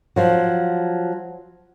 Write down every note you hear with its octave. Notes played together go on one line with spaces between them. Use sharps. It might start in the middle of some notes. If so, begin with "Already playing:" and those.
F3 F#3